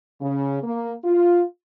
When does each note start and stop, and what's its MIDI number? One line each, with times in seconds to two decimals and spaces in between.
0.21 0.58 49
0.63 0.92 58
1.04 1.42 65